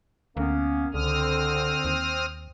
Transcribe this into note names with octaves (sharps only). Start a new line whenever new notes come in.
D2 A#3 B3 C#4
C#2 D3 C4 D#6 F6
D#2